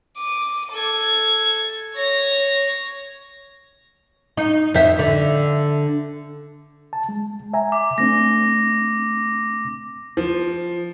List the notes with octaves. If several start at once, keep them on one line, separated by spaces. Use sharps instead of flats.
D6 D#7
A4 G#6
C#5 A#6
D#4
F2 C5 E5
D3
A5
G#3
E5 G#5 A#5
D6
A3 C4 D4 A#6
F3